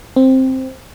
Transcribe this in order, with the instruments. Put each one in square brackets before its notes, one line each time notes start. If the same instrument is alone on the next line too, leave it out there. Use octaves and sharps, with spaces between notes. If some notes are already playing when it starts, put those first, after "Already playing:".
[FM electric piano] C4